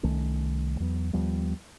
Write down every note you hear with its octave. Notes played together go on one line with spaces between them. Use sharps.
C2 D#3 A3 C#4
E2 F#3 B3
D#2 F3 G3 B3